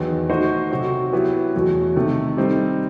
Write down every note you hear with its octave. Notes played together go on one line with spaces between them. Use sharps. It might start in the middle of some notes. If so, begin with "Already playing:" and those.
Already playing: E2 D#3 F#3 B3
A3 D#4 F#4 C5 D#5
C3 F#3 C4 F#4
F#3 B3 E4 G4 B4
E2 B2 F#3 A3
C3 D#3 A3
G3 C4 D#4